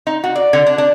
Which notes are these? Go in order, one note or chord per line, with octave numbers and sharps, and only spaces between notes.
D#4
F#4
D5
D3
D4
D4